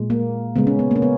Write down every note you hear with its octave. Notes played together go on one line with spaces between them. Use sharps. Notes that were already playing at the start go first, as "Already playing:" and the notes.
Already playing: A#2 G#3
A#3
C#3 G#3 B3
C#4
B3
A#3 C#4
B3